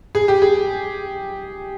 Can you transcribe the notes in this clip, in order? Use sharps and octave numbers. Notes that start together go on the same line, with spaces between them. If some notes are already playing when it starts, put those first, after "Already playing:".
G#4
G4
G#4